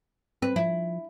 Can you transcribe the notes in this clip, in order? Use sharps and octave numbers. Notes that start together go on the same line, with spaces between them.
C4 B4
F3 E4